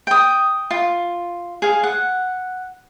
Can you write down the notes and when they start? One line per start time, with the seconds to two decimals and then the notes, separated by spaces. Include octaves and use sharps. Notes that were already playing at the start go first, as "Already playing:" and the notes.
0.07 G5 D#6
0.71 F4
1.62 G#4 F5
1.83 F#5